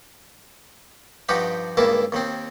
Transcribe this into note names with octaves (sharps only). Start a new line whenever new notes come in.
G2 F3 D#4 F#4 G4 G5
C#2 G2 D#3 A#3 E4 A5
D#2 D#3 C4